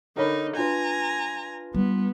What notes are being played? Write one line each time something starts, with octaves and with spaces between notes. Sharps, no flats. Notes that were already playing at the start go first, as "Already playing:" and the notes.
D3 D#4 A#4 C#5 B5
D4 F4 B4 G#5 A#5
G3 B3